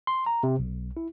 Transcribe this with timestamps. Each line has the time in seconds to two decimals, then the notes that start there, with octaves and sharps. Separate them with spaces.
0.07 C6
0.26 A#5
0.43 C3
0.59 B1
0.97 E4